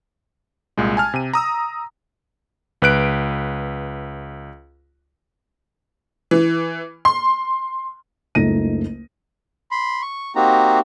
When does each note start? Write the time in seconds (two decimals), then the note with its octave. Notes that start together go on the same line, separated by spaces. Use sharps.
0.78 C2 A#2 G#3
0.97 G#5 A5 F6
1.14 C3 D#7
1.33 A#5 D#6 E6
2.82 C#2 B4 F#6 D7
6.31 E3
7.05 C6
8.35 F#1 C#2 A3 D#4 A#6 D#7
9.71 B5 C6
10.02 C#6
10.36 A#3 C4 D#4 F#4 G4 A#5